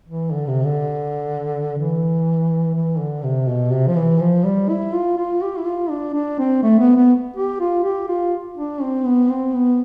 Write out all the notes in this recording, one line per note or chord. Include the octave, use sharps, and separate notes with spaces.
E3
D3
C3
D3
E3
E3
D3
C3
B2
C3
F3
E3
F3
G3
E4
F4
F4
G4
E4
F4
D4
D4
C4
A3
B3
B3
G4
F4
G4
F4
D4
C4
B3
C4
B3